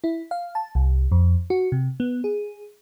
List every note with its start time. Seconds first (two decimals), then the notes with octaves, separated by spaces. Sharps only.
0.04 E4
0.31 F5
0.55 A5
0.75 C2
1.12 F2
1.50 F#4
1.72 C3
2.00 B3
2.24 G#4